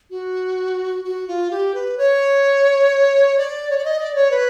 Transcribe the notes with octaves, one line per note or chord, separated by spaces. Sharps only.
F#4
F#4
F4
G4
B4
C#5
D5
C#5
D5
D#5
D5
C#5
B4